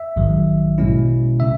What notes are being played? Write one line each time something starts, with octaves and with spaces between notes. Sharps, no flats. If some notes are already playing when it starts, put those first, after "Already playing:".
Already playing: E5
A#1 G#2 D#3 F#3
B2 G#3 C#4 E4
C#3 E5